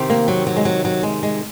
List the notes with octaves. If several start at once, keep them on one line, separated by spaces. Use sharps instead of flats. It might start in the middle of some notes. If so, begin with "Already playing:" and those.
Already playing: C3 D#3
A#3
F#3
F#3
G#3
F#3
F#3
G#3
G#3